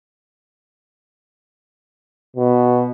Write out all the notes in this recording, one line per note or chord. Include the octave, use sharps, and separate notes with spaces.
B2